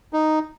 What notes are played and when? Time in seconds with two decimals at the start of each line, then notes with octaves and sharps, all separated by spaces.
0.13 D#4